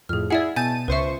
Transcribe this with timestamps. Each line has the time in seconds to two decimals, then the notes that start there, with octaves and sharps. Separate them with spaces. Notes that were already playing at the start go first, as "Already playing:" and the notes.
0.09 F2 A2 G#4 F6
0.30 E4 G#4 D5 E5 F#5
0.56 B2 G#5 A5 G6 A6 D#7
0.88 C#2 B4 C5 E5 C#6